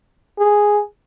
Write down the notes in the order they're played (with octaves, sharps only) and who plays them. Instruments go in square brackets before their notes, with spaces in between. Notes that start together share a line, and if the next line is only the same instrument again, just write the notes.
[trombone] G#4